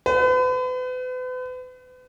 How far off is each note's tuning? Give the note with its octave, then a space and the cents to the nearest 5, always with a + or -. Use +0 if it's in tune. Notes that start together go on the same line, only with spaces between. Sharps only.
B4 +40